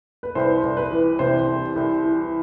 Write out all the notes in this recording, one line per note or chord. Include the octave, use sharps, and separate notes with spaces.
B4
C2 C5
C2
B4
E3
C3 C5
C2
C2
E3